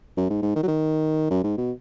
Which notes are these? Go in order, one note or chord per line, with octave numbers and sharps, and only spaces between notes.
F#2
G#2
G#2
D#3
F#3
D#3
F#2
G#2
B2